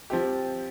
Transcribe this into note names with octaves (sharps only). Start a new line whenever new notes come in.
F3 C4 G4